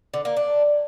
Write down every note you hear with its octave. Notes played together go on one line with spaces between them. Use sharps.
D3
A#3
D4